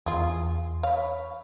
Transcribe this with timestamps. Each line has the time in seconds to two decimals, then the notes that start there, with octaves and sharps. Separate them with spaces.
0.06 E2 F4 G#4
0.83 C#5 F5 B5